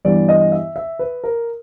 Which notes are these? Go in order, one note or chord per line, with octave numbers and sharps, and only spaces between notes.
G2 E3 G3 B3 D5
D#5
E5
E5
B4
A#4